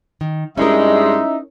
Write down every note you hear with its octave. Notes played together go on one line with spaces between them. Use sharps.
D#3
G2 G3 G#3 C#4 D#4 E4 A#4 E5